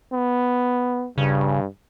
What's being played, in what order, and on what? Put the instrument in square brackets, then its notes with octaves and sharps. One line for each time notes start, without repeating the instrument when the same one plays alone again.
[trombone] B3
[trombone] G2 [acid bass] C#3